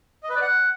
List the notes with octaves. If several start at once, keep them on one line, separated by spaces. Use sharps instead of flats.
D#5
B4
D5
F#5